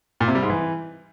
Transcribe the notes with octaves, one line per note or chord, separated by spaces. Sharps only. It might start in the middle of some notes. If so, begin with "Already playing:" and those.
A#2
C3
G3
G#2
E3